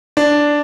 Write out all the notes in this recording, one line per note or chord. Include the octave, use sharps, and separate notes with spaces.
D4